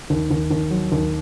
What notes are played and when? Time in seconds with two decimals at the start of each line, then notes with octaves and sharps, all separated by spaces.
0.10 D#2
0.30 D#2
0.51 D#2
0.70 F#3
0.92 D#2